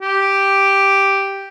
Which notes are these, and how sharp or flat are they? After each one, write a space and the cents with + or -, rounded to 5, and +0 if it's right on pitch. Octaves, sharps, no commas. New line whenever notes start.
G4 +0